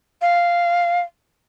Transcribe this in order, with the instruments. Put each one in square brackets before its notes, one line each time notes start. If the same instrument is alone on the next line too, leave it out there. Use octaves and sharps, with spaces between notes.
[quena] F5